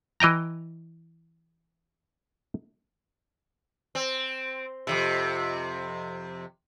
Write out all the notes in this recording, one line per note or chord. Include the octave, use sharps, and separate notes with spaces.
E3 D#5 G5 A#5
C4
F2 G#2 C3